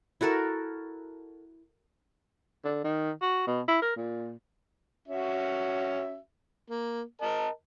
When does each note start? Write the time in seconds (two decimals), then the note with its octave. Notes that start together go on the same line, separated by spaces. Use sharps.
0.21 E4 F#4 A4 A#4
2.65 D3
2.84 D#3
3.21 F#4
3.47 B2
3.68 E4
3.82 A#4
3.96 A#2
5.08 C#4 F#4 E5
6.70 A#3
7.21 A#4 D#5 A5